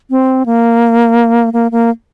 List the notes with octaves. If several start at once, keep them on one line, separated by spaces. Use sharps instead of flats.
C4
A#3
A#3
A#3